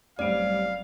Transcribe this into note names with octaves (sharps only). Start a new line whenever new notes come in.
F#1 A2 G3 C4 D5 F5 D7